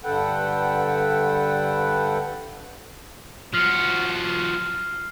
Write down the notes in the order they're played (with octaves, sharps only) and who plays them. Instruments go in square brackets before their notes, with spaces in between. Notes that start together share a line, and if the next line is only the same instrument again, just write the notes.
[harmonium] G2 D3 A4 B4 F#5 G5
[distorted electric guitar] F3 F#4 [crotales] F6 C7